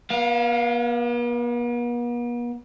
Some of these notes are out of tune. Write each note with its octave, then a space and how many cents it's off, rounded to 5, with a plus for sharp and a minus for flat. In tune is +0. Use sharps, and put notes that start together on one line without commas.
B3 -45 F5 +0